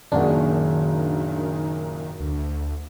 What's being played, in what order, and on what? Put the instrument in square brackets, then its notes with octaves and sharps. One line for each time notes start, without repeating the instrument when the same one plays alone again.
[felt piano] F#1 A#2 G#3 [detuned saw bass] D#3 [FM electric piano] D4 F#4
[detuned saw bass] D2